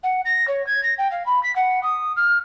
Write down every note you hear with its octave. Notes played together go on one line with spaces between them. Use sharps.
F#5
A#6
C#5
G#6
A#6
G5
F5
B5
B6
F#5
D#6
F6